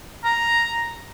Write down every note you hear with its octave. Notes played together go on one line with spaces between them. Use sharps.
A#5